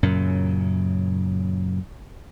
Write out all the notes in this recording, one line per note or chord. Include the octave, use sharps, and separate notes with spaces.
F#2 A#2 C#3